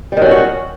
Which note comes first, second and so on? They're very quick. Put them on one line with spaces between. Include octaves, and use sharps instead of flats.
G3 D#3 F#3 C#4 F#4